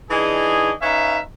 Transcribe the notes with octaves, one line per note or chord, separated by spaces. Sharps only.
E3 D4 D#4 G#4
C#4 D#4 B4 E5 F5